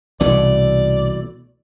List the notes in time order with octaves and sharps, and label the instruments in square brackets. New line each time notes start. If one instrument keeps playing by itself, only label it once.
[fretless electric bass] C2 [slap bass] B2 E3 A3 [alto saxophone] D5